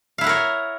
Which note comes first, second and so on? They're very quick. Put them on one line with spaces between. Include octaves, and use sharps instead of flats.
F5 E4 F#5 A#4 C#5